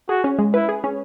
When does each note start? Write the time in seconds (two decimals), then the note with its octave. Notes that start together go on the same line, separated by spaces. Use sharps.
0.09 F#4 G#4
0.24 C#4
0.39 G#3
0.54 E4 B4
0.69 G#4
0.84 C#4